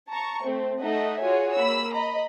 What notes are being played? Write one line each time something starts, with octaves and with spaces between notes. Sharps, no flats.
A5 A#5 C#6
A3 C4
A3 D#4 A4 D#5 E5 F#5
F4 F#4 G#4 C#5 G#5
A#3 B5 E6
D#5 A#5 B5